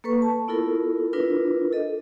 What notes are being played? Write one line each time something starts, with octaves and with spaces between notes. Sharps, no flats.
A#3 A4 B4 C#6
A5
B3 E4 F4 A4 A#4
D4 E4 F4 A#4 B4
A4 D#5